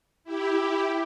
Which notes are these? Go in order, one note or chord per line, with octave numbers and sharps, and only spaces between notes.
E4 G4